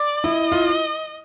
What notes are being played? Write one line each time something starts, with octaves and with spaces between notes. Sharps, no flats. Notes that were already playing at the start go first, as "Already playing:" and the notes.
Already playing: D5
E4 D#5
F4